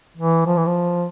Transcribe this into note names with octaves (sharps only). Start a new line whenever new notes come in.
E3
F3
E3
F3